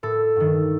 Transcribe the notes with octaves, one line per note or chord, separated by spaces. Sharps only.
A2 A4
G2 D#3